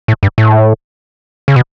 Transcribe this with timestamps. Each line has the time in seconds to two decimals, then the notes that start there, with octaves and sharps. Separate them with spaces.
0.08 A2
0.23 G2
0.38 A2
1.48 C#3
1.56 B2